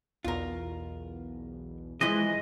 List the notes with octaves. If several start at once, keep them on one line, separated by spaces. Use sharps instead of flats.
B1 E2 B2 F4 A#4
E3 F3 G#3 E4 D#5 C6 F#6